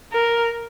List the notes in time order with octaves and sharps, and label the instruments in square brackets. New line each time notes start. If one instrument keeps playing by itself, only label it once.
[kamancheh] A#4